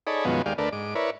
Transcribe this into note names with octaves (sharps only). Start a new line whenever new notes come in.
D#4 G#4 A4 C#5 D5 B5
F#2 B2 D#3 F3 G#3 B3
D#2 G#3 G4 D5 F5
D2 A3 A#4 B4 D5
G#2 D6
E4 A#4 B4 C#5 D5